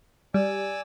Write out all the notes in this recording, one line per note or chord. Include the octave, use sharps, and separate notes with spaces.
G3 D5 G#5 E6